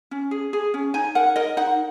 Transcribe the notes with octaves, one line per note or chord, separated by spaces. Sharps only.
C#4
G#4
G#4
C#4
D#4 G#5
A#4 F#5
A#4 D#5
D#4 F#5